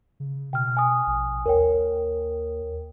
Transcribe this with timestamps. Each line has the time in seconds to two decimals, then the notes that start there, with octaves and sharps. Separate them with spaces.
0.20 C#3
0.53 B2 G5 F6
0.77 G#5 D#6
1.07 A#1
1.46 D#2 A#4 C#5 G5